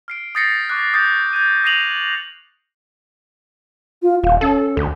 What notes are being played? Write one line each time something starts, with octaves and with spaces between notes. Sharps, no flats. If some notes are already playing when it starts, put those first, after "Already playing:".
F6 C7 D7
D#6 G6 A6 A#6 C7 C#7
C#6 D6 F#6
D6 D#6 G6 A6 C7
G6 G#6 D#7
D#6 A#6 C7 D#7 F7 F#7
F4
D#1 F5
C#4 A4
D2